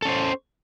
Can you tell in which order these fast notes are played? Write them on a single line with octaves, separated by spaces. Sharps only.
A4 C#4 C5